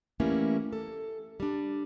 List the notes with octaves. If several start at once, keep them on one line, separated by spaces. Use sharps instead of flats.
E3 G3 A3 A#3 C#4 E4
A4
G3 D4